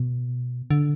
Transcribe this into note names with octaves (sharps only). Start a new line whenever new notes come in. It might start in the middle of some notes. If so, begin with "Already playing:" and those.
Already playing: B2
D3